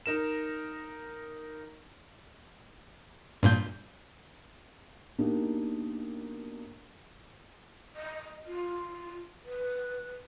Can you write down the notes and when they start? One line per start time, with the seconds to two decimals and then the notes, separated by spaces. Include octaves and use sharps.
0.06 D#4 A#4 E7
3.43 G2 A#2 G6
5.18 B2 A#3 D4 D#4 G4
7.96 D#5
8.46 F4
9.45 B4